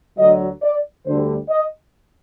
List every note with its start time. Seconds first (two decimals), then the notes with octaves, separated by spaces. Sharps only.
0.18 D2 D3 F#3 D#5
0.62 D5
1.06 D2 D3 G3 C5
1.49 D#5